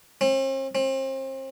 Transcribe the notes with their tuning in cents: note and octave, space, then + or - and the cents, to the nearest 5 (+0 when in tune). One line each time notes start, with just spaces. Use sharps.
C4 +45
C4 +35